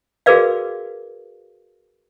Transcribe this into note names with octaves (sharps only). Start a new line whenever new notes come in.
F#4 G#4 A#4 B4 D5 F5